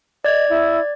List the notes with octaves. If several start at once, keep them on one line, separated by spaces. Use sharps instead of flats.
D5 D#5 G#6
E4